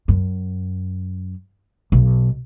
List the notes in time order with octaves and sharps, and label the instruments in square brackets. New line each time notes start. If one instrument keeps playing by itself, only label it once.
[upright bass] F#2
B1